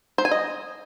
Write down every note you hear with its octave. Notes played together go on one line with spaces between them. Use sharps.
C5
G#5
D#5